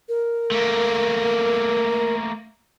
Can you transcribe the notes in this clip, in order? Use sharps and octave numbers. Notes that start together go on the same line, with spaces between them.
A#4
A3 A#3